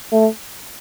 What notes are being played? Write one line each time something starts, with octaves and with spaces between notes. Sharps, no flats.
A3